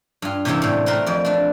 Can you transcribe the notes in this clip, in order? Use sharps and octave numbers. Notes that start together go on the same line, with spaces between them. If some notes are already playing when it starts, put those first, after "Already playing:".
G2 F4
C3 E3 A#3 C#4 E4 G4
A2 G3
A3 C4 F4 A#4 B4
F2 D5
A3 D4